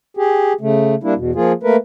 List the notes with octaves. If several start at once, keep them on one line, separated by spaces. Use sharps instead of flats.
G4 G#4
C#3 A3
G3 A#3 D4 E4
E2 B2
F3 A#3 F4 G#4
A3 A#3 A#4 B4